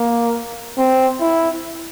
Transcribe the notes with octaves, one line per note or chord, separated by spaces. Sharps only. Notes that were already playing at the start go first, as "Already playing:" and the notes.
Already playing: A#3
C4
E4